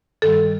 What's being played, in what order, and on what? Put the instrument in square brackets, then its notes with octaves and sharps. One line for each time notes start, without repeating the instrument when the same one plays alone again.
[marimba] G2 D#3 G3 A4